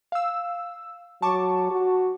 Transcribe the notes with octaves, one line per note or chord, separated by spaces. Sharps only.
F5 E6
F#3 A5 C#6 D6
F#4